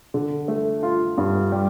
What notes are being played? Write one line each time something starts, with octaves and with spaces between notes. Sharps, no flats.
D3
A3
F4
G2
G3